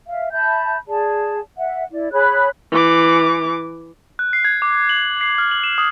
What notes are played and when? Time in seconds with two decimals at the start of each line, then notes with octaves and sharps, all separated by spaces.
0.07 E5 F5
0.32 E5 A5 B5 G6
0.88 G#4 D5 A5
1.58 E5 F#5
1.92 E4 D5
2.12 G#4 C#5 B5 F#6
2.72 E3 D6
4.19 F#6
4.33 C7
4.45 G#6
4.62 D6
4.89 F#7
5.21 C7
5.38 F6
5.51 F#7
5.64 E7
5.78 D#6